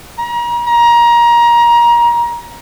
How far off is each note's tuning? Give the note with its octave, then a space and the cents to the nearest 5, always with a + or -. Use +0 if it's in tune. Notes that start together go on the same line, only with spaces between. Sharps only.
A#5 +35
A#5 +25